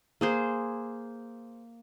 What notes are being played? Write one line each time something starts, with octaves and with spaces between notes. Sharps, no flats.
A#3 G#4 C5